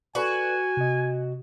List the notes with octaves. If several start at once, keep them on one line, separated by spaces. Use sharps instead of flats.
F#4 A4 B4 D5 G#5
C3 D#5